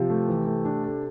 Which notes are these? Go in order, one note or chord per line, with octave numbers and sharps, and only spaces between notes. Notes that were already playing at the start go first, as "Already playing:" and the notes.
Already playing: C3 F3
A3
E3
A3
D4
A4